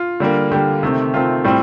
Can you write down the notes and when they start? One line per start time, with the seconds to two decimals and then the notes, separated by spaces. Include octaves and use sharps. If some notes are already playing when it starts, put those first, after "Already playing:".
Already playing: F4
0.20 D3 G3 A#3
0.51 D3 G3 A#3 G4
0.83 C3 D#3 A3 C4
1.14 C3 D#3 A3 C4 F4
1.44 A2 G3 C4